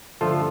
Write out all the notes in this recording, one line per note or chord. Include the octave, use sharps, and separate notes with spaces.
G2 D3 F3 A3 F4 A4